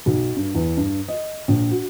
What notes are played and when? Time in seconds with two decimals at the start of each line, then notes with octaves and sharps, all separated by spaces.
0.06 B1
0.36 G2
0.54 E2
0.77 G2
1.08 D#5
1.48 A#1
1.71 F#4